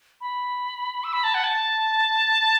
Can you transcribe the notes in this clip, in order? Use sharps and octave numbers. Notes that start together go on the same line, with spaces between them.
B5
E6
B5
A5
F#5
A5